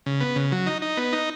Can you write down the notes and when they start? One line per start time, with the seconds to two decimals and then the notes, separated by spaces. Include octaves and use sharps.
0.06 C#3
0.21 B3
0.36 C#3
0.52 F#3
0.66 D#4
0.82 D#4
0.97 B3
1.13 D#4